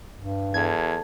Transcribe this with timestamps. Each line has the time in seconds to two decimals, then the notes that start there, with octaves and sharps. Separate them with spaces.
0.16 G2
0.54 E2 A4 A5 G#6